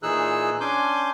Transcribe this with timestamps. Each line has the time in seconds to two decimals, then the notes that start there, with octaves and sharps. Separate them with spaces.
0.03 A#2 E3 D#4 G#4 E6 F#6
0.60 C#4 D4 G#5 C6 D6 G6